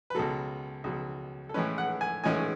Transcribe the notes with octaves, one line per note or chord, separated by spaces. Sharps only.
B4
C#2 B2 F#3 A4
C#2 B2 F#3
A4
A2 E3 G#3 C#4 B4
F#5
G#5
A2 E3 G#3 C#4 G#5